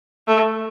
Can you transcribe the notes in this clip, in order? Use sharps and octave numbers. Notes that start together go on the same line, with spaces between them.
A3